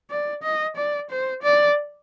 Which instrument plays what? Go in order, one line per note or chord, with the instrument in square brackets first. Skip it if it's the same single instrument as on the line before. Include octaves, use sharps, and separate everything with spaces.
[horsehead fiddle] D5
D#5
D5
C5
D5